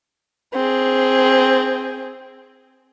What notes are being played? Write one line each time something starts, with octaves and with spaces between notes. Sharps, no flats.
C4 G#4